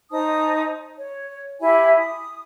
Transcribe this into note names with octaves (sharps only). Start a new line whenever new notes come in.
D#4 C5 A5 D#6
C#5
E4 G4 E5 G#5
D#6